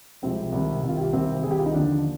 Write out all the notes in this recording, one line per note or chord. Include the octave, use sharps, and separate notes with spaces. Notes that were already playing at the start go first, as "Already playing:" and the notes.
C2 C3 F3 G#3 C4
C2 C3 D#3
C2 C3 D#3
F4
G4
C2 C3 D#3 C4
C2 C3 D#3 G#4
G4
F4
D#4
D#2 D3 F3 D4